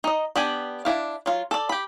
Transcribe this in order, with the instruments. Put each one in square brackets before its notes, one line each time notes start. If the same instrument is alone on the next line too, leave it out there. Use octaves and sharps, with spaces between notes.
[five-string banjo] D#4 D#5
B3 D4 G4 G#5
D4 E4 F5
F#3 F4
A4 D5
G4 B5